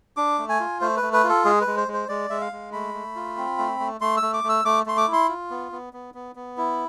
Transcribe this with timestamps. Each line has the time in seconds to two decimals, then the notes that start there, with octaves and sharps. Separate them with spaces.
0.17 D4 D6
0.38 A3
0.49 G#5
0.60 F4
0.81 A3 C5
0.97 B4
1.02 A3
1.13 B4
1.24 F4
1.29 A4
1.45 G#3 G#4
1.61 B4
1.67 G#3
1.77 C5
1.88 G#3
1.93 C5
2.09 G#3 D5
2.30 G#3 E5
2.41 F5
2.52 G#3
2.73 A3 B5
2.94 A3
3.16 F4
3.37 C4
3.58 A3
3.80 A3
4.01 A3 C6
4.17 E6
4.22 A3
4.34 D6
4.44 A3
4.49 E6
4.65 A3 D6
4.86 A3 C6
4.97 D6
5.08 E4
5.13 C6
5.29 F4
5.50 B3
5.72 B3
5.93 B3
6.14 B3
6.36 B3
6.58 E4